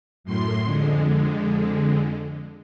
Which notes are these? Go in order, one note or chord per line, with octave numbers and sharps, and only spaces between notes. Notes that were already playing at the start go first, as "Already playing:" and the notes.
F#2 A2 C6
F2 D3 G#3